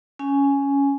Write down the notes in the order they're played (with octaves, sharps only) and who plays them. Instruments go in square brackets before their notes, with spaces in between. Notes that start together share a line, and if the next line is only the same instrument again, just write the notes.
[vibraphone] C#4 G#5